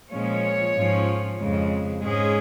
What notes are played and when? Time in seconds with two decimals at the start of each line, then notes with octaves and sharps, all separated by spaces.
0.11 A#2 F3 G#3 C#4 C#5
0.74 G#2 F3 C#4
1.38 F2 C#3 G#3
2.01 G#2 G#3 C#4 G#4